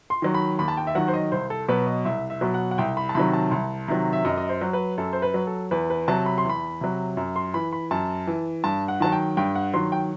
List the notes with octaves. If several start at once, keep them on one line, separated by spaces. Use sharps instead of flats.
C6
D#3 F#3
B5
D#2 B5
A5
G5
E5
D#3 F#3 F#5
C5
D#5
C2 C5
A4
B2 F#3 B4
D#5
C2 E5
E5
B2 F#3
F#5
F#5
C2 G5
B5
A5
C3 D#3 F#3 B5
A5
C2
C3 D#3 F#3
E5
F#2 D#5
D#5
C5
F#3
B4
F#2 A4
C5
B4
F#3
A4
E2 B4
B4
C3 F#3 A5
B5
C6
E2
B5
C3 F#3
F#2
C6
E3 B5
B5
F#2 A5
E3
G2 A5
F#5
D#3 F#3 A5
G5
G2 G5
F#5
D#3 F#3 C6
G5